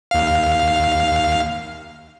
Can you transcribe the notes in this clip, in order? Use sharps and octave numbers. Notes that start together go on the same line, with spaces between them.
D#2 F5